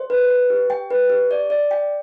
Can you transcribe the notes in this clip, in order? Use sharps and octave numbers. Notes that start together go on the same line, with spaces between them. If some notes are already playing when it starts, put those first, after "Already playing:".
Already playing: C5
B4
B4
G4
G5
B4
G4
D5
D5
G5